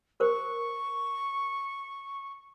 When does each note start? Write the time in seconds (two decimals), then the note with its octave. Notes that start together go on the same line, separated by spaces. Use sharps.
0.20 A#4 C5 C#6